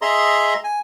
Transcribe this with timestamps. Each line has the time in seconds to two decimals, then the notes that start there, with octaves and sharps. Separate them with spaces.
0.02 G#4 D#5 E5 A#5 C6
0.64 G#5